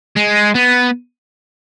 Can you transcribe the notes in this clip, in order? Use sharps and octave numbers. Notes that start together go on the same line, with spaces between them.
G#3
B3